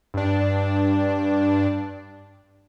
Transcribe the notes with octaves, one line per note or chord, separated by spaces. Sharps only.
G2 D4